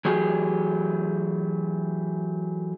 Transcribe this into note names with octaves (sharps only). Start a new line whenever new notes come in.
E3 F#3 A3 G4 G#4